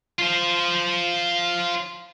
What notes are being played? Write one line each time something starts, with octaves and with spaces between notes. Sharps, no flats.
F4 C5